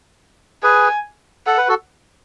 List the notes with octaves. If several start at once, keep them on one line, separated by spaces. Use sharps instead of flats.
G#4 B4 G#5
A4 F#5
B4
F#4 A4